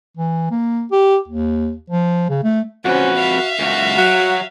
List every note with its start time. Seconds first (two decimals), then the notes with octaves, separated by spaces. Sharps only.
0.17 E3
0.51 A#3
0.92 G4
1.28 D#2
1.90 F3
2.29 C#3
2.43 A3
2.85 F2 C#4 F#4 B4 C5
3.19 E5 F5
3.59 C#2 F#4
3.98 F#3 F#4